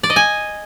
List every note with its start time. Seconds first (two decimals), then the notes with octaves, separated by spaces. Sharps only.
0.03 D5
0.10 D#5
0.16 G#5